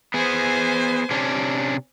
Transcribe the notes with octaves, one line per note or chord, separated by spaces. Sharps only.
B3 G#4 C5 G#5
C3 C#4 D4